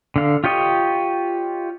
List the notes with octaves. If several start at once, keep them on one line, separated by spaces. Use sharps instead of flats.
D3 F5
F4 G4 C#5 D#5